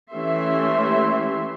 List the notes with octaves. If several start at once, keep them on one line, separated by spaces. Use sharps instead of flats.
E3 A3 C#4 G4 E5 C6